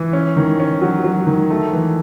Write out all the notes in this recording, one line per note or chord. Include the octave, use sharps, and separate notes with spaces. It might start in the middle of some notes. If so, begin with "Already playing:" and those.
Already playing: E3
C#4
D#3
C#4
F#3
F#3
D#3
A3
E3